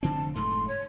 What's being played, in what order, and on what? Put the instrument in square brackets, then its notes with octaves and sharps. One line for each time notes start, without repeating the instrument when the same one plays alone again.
[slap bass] F1 D3 C4 [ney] A5
[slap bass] F1 G#2 A3 [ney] C6
[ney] C#5